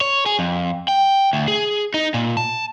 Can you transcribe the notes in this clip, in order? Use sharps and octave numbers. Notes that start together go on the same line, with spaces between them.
C#5
G#4
F2
G5
D2
G#4
D#4
A#2
A5